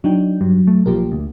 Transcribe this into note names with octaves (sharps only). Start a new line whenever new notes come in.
F#3 D4 D#4 G5
G2 F#3
A3
B1 F3 A#3 G4 A#4
D2